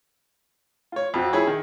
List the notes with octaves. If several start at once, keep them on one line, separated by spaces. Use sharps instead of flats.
F4 C#5
F2 F3 F#4
E4 G#4 C#5
D#3